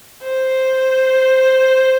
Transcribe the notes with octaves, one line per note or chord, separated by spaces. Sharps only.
C5